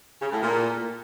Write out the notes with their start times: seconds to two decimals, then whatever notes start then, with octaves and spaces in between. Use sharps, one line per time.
0.20 C#3
0.31 A2
0.41 A#2